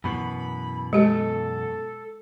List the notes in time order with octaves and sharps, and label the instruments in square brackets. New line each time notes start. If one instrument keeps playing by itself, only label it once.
[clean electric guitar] F#2 B2 E3 [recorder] B5
[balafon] G#3 G4 [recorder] A4